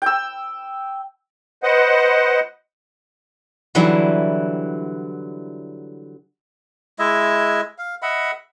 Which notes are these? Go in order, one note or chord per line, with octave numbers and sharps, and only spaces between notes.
G5 E6
B4 C5 D#5 F#5
D3 E3 F#3 G3 E4
G#3 E4 D#5 E5
F5
D#5 E5 F#5 B5